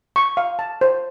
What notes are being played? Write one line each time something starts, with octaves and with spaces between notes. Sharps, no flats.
C#6
F5
A5
C5